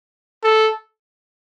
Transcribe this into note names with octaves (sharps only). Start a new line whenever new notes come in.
A4